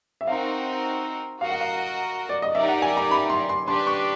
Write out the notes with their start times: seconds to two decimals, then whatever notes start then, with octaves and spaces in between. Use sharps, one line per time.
0.21 E5
0.27 C4 D#4 F#4 A#4 F5
1.41 F#4 A#4 D#5 F5
1.50 F#5
1.60 F5
2.29 D5
2.42 D#5
2.55 D#4 G4 A#4 D5 E5
2.68 F#5
2.82 G#5
2.97 A#5
3.11 B5
3.29 C6
3.49 C6
3.68 D4 G4 B4 C6
3.87 C#6